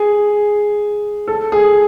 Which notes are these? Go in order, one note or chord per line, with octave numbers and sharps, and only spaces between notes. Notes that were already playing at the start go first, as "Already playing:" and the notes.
Already playing: G#4
A4
G#4